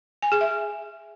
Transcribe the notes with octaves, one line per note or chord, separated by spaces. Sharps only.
G#5
G#4
E5